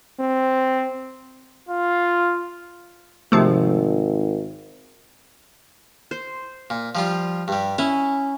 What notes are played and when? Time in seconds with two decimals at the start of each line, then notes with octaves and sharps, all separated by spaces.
0.19 C4
1.69 F4
3.32 G#1 C3 F3 A3
6.11 C5
6.70 A#2
6.95 F3 G3 F4
7.48 G2 G3
7.78 C#4 E4